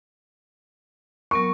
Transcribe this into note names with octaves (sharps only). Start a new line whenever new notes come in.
F#3 B3 A#4 C#6